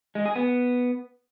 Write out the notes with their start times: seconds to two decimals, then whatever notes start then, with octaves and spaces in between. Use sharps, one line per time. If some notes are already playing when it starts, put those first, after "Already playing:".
0.15 G#3
0.25 G#4
0.36 B3